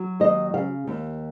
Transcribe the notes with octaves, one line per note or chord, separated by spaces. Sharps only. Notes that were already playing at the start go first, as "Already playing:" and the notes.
Already playing: F#3
D#2 D#5
C#3 F5
D#2